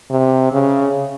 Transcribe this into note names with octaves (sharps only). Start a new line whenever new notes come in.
C3
C#3